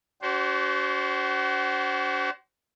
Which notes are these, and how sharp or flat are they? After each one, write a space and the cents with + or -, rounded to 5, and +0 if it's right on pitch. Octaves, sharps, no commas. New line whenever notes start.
D4 -40 F#4 +35 C5 +0